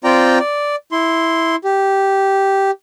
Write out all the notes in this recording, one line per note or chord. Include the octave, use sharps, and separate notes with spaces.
C4 F4 D5 G5 A#5
D5
E4 C6
G4